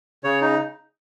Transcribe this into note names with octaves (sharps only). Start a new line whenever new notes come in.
C#3 C#5
D#4